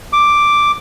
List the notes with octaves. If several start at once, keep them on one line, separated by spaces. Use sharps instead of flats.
D6